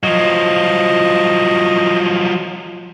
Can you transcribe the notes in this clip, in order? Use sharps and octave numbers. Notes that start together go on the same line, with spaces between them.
F3 F#3 D#5